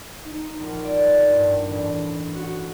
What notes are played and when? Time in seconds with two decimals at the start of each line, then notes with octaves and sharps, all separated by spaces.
0.25 D#4
0.59 A#1
0.85 D5
1.29 G2
1.68 A1
2.35 F#4